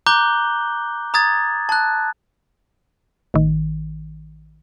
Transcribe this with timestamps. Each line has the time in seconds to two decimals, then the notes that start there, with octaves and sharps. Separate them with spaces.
0.06 A#5 D6 F#6 G6 G7
1.14 A#5 D#6 G#6 A6
1.69 A5 F#6
3.34 A1 D#3